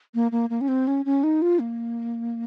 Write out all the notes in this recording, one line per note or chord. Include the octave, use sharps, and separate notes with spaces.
A#3
A#3
A#3
C#4
C4
C#4
C#4
D#4
F4
A#3